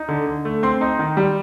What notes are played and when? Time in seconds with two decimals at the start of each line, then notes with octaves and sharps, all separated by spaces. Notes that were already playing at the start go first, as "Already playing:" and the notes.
Already playing: D#4
0.09 D3
0.26 D3
0.45 A3
0.63 C4 C6
0.81 D#4
0.99 D#3
1.17 G3